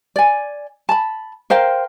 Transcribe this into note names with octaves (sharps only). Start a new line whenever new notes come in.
D5 G#5
A5 B5
A#4 C5 F5 G5